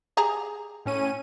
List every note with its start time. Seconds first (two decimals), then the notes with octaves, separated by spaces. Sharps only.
0.17 G4 G#4 A#5
0.86 A2 C#4 D#7